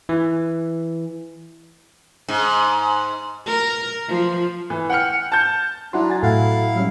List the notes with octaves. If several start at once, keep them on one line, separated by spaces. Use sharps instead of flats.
E3
G#2
A#4
F3
E3
F#5 G5 F6 C#7
A5 G6
F#3 D4 E4 F#5 A#5 C6
G#5 A6
A2 E4 A4 F5 F#5
F#3 G3 C#4